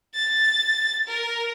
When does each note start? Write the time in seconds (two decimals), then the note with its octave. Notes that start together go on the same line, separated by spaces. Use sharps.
0.15 A6
1.08 A#4